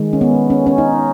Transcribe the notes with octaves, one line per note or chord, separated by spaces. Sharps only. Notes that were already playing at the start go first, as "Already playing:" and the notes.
Already playing: D#3 G#3
C#4
B3
C#4
C#4
D#4